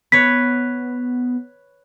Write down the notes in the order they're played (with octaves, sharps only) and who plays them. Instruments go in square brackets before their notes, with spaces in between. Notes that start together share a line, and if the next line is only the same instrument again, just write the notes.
[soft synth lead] B3 [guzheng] B4 C#5 [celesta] B6